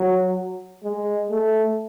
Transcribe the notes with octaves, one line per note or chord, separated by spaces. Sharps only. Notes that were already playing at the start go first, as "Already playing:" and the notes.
Already playing: F#3
G#3
A3